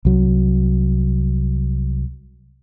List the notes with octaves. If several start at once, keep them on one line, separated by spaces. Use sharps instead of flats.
C2 F#3